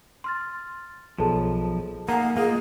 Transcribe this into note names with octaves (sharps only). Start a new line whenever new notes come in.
C6 F6 A6
B1 F3 G#4 A4 A5
A#3 D#4 F5 F#5 G#5 A#5
A#3 F4 G#4 D#5